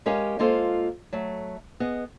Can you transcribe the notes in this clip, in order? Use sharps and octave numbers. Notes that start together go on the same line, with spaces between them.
G#3 C#4 G4 A#4 C#5 F5
G#3 A#3 F4 A4 C5
F#3 A3
B3 G#4 D#5